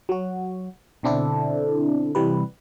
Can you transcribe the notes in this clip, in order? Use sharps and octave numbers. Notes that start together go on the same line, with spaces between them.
F#3 F#4
B2 D3 C4 D4 E4 A4
C3 E3 G3 B4